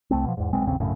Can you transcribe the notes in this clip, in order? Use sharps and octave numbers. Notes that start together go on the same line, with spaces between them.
C2 A3 C4
B2 F3
E2 G#2
D#1 B1 G#3 C4
A1 D#2 C#3 C4
A#1 F#2 A2 C#3